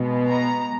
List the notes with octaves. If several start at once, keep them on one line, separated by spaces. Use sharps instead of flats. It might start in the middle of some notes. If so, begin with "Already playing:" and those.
Already playing: B2 G#3 B3
A#5